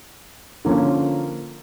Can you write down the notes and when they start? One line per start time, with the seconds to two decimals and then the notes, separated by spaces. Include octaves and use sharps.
0.65 D3 F3 A#3 C#4